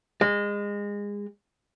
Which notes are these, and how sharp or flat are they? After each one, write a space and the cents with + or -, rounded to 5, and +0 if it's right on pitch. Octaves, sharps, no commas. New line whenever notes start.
G#3 -25